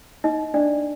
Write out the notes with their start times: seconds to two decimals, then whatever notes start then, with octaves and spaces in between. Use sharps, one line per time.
0.24 D#4 D#5
0.54 D4 D5